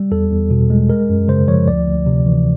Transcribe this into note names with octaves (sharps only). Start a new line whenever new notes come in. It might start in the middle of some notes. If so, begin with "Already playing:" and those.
Already playing: G3
E2 A4
E2
B2
G#3
G#3 A#4
F#2
C#3 C5
F3 C#5
D2 D5
D2
C3
E3